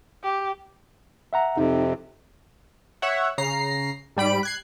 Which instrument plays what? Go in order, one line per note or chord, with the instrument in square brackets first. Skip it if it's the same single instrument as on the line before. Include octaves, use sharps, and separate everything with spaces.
[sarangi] G4
[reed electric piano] E5 F#5 A#5
[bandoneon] F2 C3 [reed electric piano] D#4
[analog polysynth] C#5 E5 F#5
C#3 A#5 C7
G#2 G3 B5 D7
F#6 G#6 C7